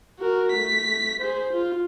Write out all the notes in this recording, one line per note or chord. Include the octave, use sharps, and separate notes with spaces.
F#4 A#4
A3 B6
G#4 C5
F4